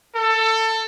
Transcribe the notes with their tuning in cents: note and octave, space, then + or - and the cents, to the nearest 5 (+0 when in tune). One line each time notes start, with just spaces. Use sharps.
A4 +20